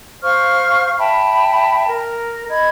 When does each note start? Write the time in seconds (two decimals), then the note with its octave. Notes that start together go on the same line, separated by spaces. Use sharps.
0.23 C5 F5 C#6 F6
0.99 E5 G5 A5 B5
1.89 A#4
2.50 D#5 B5 G#6